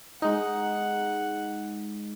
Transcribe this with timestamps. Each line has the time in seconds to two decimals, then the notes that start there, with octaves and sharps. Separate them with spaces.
0.22 G#3 D#4 F#5